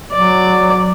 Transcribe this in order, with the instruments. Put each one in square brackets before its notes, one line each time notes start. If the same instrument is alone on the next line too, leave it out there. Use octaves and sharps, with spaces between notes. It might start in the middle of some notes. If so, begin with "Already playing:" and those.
[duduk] F#3 [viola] D5